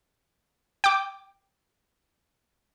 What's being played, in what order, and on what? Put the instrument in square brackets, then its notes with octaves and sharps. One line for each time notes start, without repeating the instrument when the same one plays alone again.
[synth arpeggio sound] G5 D6